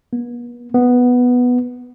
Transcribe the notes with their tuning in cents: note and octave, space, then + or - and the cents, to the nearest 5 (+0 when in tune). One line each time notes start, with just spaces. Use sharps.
B3 -40
B3 +0